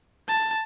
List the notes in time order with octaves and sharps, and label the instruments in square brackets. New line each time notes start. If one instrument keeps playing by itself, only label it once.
[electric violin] A5